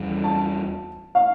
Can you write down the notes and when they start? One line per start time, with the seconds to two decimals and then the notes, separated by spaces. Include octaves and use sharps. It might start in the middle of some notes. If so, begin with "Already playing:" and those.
Already playing: E2 E3 G3
0.24 A5
1.15 F5